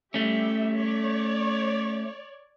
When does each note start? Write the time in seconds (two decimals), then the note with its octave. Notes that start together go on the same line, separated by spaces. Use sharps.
0.14 G3 A3 C#4 G4 E5
0.77 C#5 D5